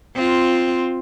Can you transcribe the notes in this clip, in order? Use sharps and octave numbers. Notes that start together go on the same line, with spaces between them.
C4 F4